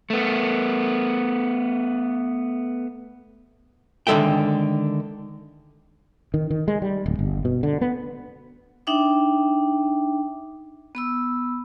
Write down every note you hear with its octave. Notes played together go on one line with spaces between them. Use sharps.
A3 B3
D3 D#3 G#3 A4 E5 G5
D#3
D#3
G#3
G3
D1
G1
B2
D3
B3
D4 D#4 E5 G5 D6
B3 B5 E6